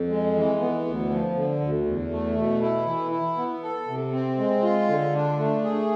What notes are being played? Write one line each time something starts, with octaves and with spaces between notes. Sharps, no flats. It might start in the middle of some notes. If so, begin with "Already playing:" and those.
Already playing: F2
G#3
E3
B3
D2
F3
D3
D2
E2
A3
B2
E4
E3
E4
B3
A4
C3
C4
G#3
F4
D3
D4
A3
G#4